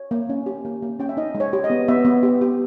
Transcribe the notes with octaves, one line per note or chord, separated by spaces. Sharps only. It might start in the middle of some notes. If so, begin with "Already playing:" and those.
Already playing: C#5
A#3
C#4
G4
A#3
A#3
C#4 G5
E5
D#4 D#5
G#3
C#5
G4
D#5
B3
B3 E5
B3
G4
G4